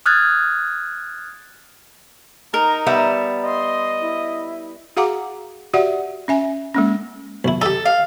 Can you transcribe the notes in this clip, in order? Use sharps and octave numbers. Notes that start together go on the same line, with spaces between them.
D#6 F6 F#6 G#6 A6
D#4 A#4 A#5
G3 B3 E5
D#5 C6
E4
F#4 G#4 F5 F#5 A#5 D6
F#4 G4 D5 E5 F#5
C#4 E5 G#5
G#3 A#3 C#4
B1 E4
D#4 G4 A4
F5